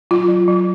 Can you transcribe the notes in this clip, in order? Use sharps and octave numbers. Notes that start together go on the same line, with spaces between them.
F#3 F4
F#3
F#3